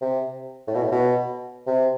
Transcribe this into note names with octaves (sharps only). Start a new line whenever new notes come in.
C3
A2
B2
A2
B2
C3